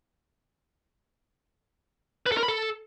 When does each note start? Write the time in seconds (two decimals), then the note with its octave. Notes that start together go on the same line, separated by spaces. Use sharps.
2.26 B4
2.32 A4
2.37 A#4
2.43 B5
2.48 A4